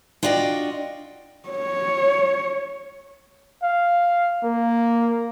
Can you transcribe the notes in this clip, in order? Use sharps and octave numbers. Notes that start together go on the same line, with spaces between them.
D4 F4 F#4 D5 D#5 G5
C#5
F5
A#3